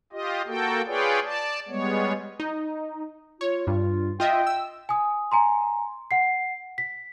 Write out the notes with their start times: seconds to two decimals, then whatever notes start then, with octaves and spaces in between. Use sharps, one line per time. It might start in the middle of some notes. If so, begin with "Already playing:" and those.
0.12 F4 G4 D#5
0.47 A#3 F#4 A4 G5
0.87 F4 G#4 B4 C#5 D5 G5
1.24 D5 A5
1.69 G3 G#3 B3 C#5
2.40 D#4
3.41 F4 C#5
3.67 G2 F4
4.20 F4 D#5 E5 G5
4.47 E6
4.89 G#5 D#6
5.32 G#5 A#5 C6
6.11 F#5 C7
6.78 B6